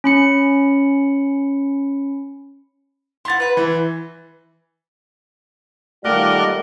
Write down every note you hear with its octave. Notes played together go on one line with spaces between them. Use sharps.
C#4 B5 C#7
E4 F4 F#5 C6 A6
B4 B5
E3 B4
D#3 G3 A3 F4 A#4 D5 D#5 F#5